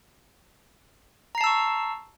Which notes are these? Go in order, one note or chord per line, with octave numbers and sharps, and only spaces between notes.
A5 A#5 C#6 E6 C7